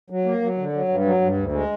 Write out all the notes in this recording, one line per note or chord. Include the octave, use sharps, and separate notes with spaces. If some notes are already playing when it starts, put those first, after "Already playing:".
F#3
A#3
F#3
D3
F#3
G2
F#3
G2
D2
G#3